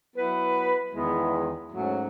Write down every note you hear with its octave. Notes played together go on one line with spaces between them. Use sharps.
F#3 B3 E4 B4
E2 D#3 G#3 B3 E4
G#2 F#3 A3 C#4 F#4